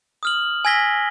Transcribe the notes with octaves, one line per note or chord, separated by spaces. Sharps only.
D#6 F6 F#7
G#5 E6 G#6 A#6 B6 G7